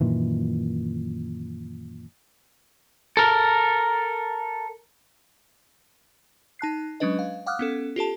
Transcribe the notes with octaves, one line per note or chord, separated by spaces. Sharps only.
F#2 A#2 D#3 E3
A4 A#4
D#4 A5 F#6 C7
F#3 G#3 C#4 D4 B4 D#5
F5
F5 F#5 D6 D#6 F6 F#6
B3 C#4 A4
F4 G4 A4 A5